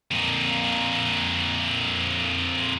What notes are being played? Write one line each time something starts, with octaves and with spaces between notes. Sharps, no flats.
F2 A#2